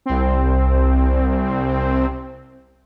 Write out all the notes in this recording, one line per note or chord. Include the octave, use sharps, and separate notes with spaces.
C2 C4